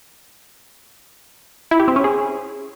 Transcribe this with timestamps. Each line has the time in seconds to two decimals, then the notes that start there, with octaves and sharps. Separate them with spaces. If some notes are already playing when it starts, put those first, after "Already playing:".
1.71 E4
1.80 G4
1.88 C4
1.96 C#4
2.04 G#4